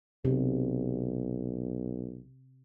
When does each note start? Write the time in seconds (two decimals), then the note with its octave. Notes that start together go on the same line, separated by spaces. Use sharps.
0.25 B1 C3